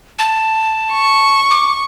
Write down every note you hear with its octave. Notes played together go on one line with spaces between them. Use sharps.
A5
C#6
D6